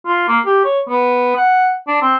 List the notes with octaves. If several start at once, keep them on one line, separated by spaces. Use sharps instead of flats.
F4
A#3
G4
C#5
B3
F#5
D4
C4